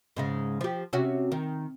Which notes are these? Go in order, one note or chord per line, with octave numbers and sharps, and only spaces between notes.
G#2 C#3 G#3
F3 G4
C3 C#4 F#4
D#3